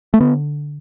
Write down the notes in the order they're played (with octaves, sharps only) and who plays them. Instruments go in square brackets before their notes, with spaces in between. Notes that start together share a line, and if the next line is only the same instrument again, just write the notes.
[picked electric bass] A3
D3 B3